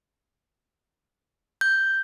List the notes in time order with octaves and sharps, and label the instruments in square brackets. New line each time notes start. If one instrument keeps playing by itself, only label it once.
[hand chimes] G6